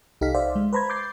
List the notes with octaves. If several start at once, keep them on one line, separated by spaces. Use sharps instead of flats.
C2 D#4 G4 A4 F5 B6
C5 D5 E5 F5
G#3
B4 C5 A#5 B5 G#6
D6 G6 A6 C7